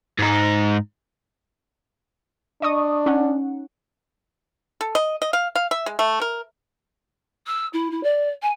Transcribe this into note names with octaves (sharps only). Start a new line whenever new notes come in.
G#2 D#4
D4 D#5 C#6 D#6
C#4 D#4 F#5
A4
D#5
D#5
F5
F5
E5
G#3
A3
A#4
E6
E4
E4
D5
G#5